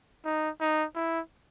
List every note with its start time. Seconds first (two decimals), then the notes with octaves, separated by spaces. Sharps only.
0.25 D#4
0.60 D#4
0.95 E4